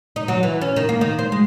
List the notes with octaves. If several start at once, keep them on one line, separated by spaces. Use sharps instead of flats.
D#4
F#3
E3
C#4
D#3
A#3
D#3
C5
G#3